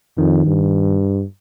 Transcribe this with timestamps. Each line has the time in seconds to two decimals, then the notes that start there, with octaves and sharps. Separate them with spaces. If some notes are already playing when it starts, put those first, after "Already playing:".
0.18 F2 D#3
0.46 G2